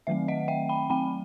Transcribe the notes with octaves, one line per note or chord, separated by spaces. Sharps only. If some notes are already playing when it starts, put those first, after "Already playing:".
D#3 F#3 A3 C4 E5
D#5 F#5
E5 G5
G5 B5
F#3 A3 C4 G5 B5